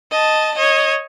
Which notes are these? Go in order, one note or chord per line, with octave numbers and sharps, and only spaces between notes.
D#5 A5
C#5 D#5